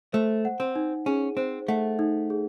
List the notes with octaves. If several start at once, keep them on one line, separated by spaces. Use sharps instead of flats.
A3 C5
F#5
C4
D#4
C#4 G#4
C4 C5
A3 F#5
D#4
G#4